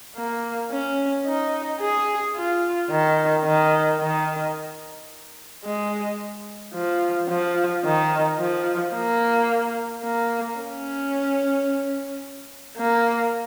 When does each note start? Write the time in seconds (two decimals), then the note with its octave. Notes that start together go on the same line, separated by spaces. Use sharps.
0.16 A#3
0.71 C#4
1.26 D#4
1.81 G#4
2.35 F4
2.91 D#3
3.45 D#3
4.01 D#3
5.65 G#3
6.74 F3
7.29 F3
7.84 D#3
8.40 F3
8.94 A#3
10.03 A#3
10.58 C#4
12.78 A#3